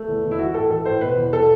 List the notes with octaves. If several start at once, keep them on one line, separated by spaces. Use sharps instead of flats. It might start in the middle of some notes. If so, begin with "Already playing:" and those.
Already playing: A3
E2
E2
E4
E3 F#4
A2 A4
E3 A4
A2 C5
B2 B4
E2
B2 A4